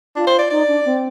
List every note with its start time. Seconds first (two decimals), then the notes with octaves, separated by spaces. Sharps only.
0.16 D4 F4
0.27 C5
0.39 D5
0.50 D#4 D5
0.68 D4
0.85 C4